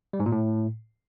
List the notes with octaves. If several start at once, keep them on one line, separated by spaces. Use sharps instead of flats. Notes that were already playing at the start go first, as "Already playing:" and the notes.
G3
G#2
A#2
A2